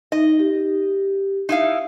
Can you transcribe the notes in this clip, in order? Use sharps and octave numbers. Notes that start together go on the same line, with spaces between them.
D#4 D#5
G4
D#4 E4 F5